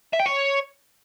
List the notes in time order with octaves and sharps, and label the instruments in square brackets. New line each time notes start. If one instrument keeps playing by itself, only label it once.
[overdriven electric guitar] E5
G5
C#5